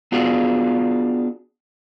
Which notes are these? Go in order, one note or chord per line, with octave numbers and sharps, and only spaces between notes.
B3 D4 F4 F#4 G#4